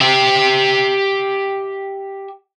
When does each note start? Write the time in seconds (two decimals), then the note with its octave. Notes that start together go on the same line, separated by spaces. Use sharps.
0.01 G4 E5